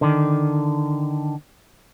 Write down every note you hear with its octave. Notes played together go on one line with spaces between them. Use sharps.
D3 D#3